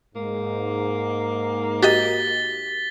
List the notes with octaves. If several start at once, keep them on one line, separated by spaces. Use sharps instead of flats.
G#2 A#3
F#4 G4 D#5 A6 B6 G7